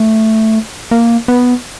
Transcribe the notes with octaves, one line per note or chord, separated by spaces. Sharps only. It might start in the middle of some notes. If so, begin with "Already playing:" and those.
Already playing: A3
A#3
B3